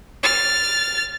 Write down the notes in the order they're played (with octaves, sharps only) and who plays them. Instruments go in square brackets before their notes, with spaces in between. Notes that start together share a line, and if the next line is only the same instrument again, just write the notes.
[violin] F6 A6